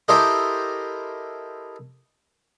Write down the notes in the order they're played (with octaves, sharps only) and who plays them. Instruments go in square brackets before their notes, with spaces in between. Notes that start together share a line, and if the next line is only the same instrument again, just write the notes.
[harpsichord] E4 G4 A4 A#4 C5 D#5